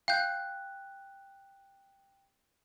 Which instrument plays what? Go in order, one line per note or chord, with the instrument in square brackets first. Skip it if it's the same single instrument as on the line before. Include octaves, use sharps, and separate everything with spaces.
[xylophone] F5 G6 [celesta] G5 F#6